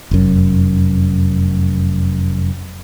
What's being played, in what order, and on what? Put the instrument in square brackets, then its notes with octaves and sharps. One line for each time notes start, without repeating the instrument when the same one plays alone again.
[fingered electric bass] F1 F#2